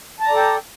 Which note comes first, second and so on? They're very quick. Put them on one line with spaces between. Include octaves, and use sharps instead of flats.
A5 A#5 D5 A4 G5